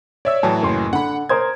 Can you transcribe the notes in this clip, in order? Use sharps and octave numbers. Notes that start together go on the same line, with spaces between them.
C#5 D5 E5 E6
A2 E3 F#3 A5
F#1 C6
D3 F#5 B5
A#4 C5 D#6 G#6